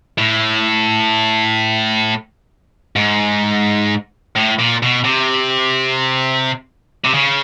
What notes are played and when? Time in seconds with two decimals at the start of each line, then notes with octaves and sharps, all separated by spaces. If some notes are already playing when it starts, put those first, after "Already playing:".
0.18 A2
2.96 G#2
4.36 A2
4.59 A#2
4.82 B2
5.05 C3
7.05 C3
7.14 C#3